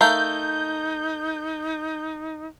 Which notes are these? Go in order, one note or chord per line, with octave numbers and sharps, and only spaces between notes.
A3 D#4 A#4 F5 G6